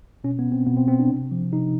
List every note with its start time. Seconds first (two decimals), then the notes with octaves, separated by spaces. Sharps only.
0.24 B2 C#4
0.39 B3
0.52 C4
0.67 B2 B3
0.77 C4
0.88 C4
0.99 D4
1.10 C3
1.31 F3
1.53 C3 D#4